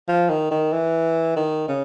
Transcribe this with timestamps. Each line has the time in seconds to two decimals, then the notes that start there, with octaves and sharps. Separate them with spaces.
0.08 F3
0.29 D#3
0.51 D#3
0.73 E3
1.36 D#3
1.68 C#3